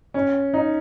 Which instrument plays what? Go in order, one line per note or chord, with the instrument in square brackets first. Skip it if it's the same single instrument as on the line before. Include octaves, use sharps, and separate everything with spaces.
[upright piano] C#4
D#4